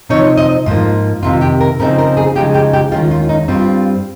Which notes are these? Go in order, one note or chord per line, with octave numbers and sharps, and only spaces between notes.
C3 F3 C4 D#4 C#5
D#5
G#2 F3 A#3 F4
F2 C3 D#3 F4
G4
A#4
C#3 F3 C4 D#4 A#4
A#4
G#4
C#3 F3 G#3 D#4 G4
G4
G4
D#2 D#3 G#3 C#4 F4
F4
D#4
G2 G3 C4 F4